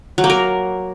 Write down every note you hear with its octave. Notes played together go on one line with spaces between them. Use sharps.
F#3
A#3
A#4